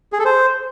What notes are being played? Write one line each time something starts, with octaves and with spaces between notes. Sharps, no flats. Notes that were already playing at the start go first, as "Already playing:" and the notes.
G#4
A4
C5